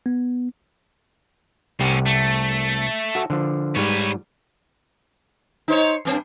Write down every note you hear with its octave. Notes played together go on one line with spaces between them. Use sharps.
B3
C2 A2 C#4 G4 F#5
A3
F#4 A4 E5
D3 F3
G#2 G3 B4 C#5
D#4 C5 C#5
G2 C4